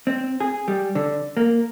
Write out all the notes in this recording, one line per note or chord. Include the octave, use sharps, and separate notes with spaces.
C4
G#4
G3
D3
A#3